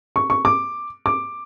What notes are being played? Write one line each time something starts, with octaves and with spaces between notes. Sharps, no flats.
C#6
C#6
D6
D6